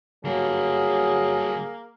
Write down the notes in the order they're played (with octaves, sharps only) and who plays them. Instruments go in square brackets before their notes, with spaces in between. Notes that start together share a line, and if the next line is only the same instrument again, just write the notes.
[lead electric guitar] D3 G3 [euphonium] F#3 [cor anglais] A#3 [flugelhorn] G#4